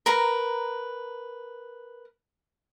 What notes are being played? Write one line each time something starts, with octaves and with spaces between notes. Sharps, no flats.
A#4 B4 A#5